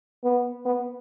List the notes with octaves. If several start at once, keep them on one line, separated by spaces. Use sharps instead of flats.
B3
B3